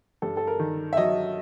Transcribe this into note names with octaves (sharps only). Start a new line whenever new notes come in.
G2 A4
A4
A#4
D#3
E5
F#3 D#5